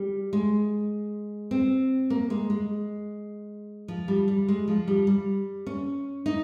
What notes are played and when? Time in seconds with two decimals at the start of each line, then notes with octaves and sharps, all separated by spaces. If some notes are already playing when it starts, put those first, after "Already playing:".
Already playing: G3
0.33 G#3
1.51 C4
2.10 A#3
2.30 G#3
2.50 G#3
3.88 F3
4.08 G3
4.28 G3
4.48 G#3
4.68 F3
4.88 G3
5.07 G3
5.67 C#4
6.26 D#4